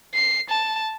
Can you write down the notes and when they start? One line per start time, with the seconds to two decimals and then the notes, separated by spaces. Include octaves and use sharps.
0.14 C7
0.49 A5